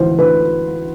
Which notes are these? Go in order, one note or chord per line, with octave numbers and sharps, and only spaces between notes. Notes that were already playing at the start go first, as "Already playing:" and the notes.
Already playing: D2 E3 C5
D2 B4